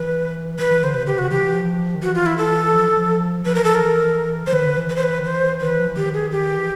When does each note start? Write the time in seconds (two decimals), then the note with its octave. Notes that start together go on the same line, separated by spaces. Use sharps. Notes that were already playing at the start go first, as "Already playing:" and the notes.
Already playing: E3 B4
0.59 E3 B4
0.71 E3
0.83 D3 C5
0.94 C3 B4
1.07 D3 G4
1.13 C3
1.18 C#3 F#4
1.31 E3 G4
1.43 E3
1.54 F3
1.95 D#3
2.02 E3 F#4
2.15 F4
2.26 E4
2.38 A4
2.73 F3
2.97 F3
3.45 F3 B4
3.55 E3 A#4
3.64 A4
3.69 F3
3.75 A#4
3.81 E3
4.47 E3 C5
4.52 D#3 B4
4.65 D3
4.77 E3
4.89 B4
4.96 C5
5.03 B4
5.20 D#3
5.25 E3 C5
5.61 D#3 B4
5.69 E3
5.79 F3
5.88 E3
5.96 D#3 G4
6.14 G#4
6.32 G4
6.57 E3